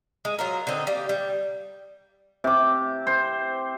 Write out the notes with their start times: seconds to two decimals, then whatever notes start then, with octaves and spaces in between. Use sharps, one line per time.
0.25 G#3
0.39 F#3 F4 A#4
0.67 D3 C4 D#4
0.87 G3 A#3
1.09 G3
2.44 C3 D6
3.07 C5